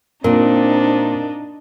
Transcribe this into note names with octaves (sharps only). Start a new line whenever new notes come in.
A#2 C4 D4 D#4 A#4